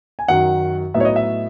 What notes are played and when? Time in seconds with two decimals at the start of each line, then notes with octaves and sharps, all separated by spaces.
0.19 G#5
0.28 F#2 D#3 F#3 F#5
0.94 A2 F#3 B3 D#4 E5
1.00 C#5
1.05 D#5
1.16 E5